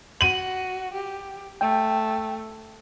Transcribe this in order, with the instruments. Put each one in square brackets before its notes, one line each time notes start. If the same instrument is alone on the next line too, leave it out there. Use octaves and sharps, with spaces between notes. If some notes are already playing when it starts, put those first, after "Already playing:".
[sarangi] F#4 [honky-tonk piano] D#7 F#7
[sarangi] G4
[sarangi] A3 [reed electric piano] G5